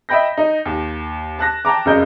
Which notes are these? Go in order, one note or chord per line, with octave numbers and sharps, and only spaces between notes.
D#5 E5 G5 B5 G6 A#6
D#4
D#2
A5 F#6 A#6
G5 A5 A#5 D6
F1 F#2 C#3 A#4 D#5 G6